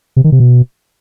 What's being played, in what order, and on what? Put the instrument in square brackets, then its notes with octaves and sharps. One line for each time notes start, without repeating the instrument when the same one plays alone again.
[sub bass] C3
D#3
C3
B2